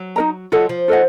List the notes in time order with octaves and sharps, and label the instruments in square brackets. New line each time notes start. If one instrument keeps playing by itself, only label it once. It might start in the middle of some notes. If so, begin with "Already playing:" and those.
Already playing: [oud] F#3
[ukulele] D#4 A#4 D#5 A#5
[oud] F#3 [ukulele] F4 A4 D#5 F#5
[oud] F3
[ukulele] F4 A4 D#5 F#5